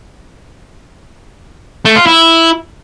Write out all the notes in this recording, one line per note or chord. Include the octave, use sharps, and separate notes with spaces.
A3
F4
E4